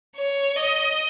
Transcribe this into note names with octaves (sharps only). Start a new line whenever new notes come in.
C#5
D#5